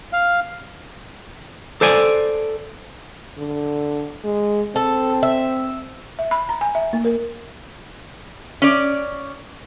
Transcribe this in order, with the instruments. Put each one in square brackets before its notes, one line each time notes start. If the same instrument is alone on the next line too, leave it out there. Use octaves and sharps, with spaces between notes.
[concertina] F5
[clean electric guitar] A4 C5 D5 G#5
[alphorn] D3
G#3
[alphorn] C4 [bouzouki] A4
[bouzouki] E5
[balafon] E5
B5
A#5
G#5
E5
A#3
A#4
[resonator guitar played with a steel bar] C#4 D5